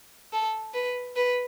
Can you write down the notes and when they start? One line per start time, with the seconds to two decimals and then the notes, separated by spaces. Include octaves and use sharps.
0.33 A4
0.74 B4
1.16 B4